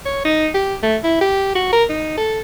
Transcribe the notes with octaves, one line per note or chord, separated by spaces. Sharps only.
C#5
D#4
G4
A3
E4
G4
F#4
A#4
D#4
A4